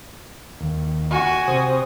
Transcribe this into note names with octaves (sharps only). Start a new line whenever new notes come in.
D#2
F#4 G#5
C3 C5 D#6